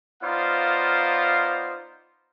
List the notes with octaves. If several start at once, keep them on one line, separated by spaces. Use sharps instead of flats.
B3 D#4 F4 C5 D5 F5